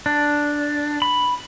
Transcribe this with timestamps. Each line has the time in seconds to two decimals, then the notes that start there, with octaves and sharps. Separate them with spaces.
0.06 D4
1.02 B5